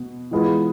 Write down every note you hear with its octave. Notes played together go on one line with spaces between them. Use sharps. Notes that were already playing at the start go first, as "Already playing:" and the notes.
Already playing: B2
E3 G#3 B3 F4